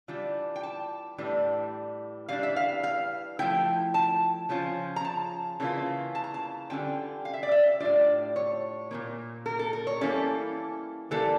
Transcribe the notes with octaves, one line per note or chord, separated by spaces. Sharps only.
E3 G3 D4 F4
G5
A5
A2 E3 G3 D4
E3 G3 D4 F5
E5
F5
F5
F3 A3 E4 G5
A5
C#3 F3 C#4 F4
A#5
A5
C#3 E3 A#3 D4 F4
A5
A#5
A5
D3 G3 C#4 F4 G5
F5
E5
D5
E5
A2 G3 D4 F4 D5
C#5
A#2 F3 A#3
A#4
A4
A#4
C#5
E3 G3 A#3 C#4 E4 A4
E3 G3 A#3 A4